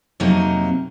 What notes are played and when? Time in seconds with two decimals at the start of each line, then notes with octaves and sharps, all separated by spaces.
0.20 F2 C3 F#3 A#3 D#4